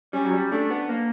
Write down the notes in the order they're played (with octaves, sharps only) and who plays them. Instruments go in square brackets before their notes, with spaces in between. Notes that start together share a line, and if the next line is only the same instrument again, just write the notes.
[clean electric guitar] G3 [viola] C#4
[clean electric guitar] F#3
G3
[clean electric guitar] A3 [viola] D4
[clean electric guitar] B3
A#3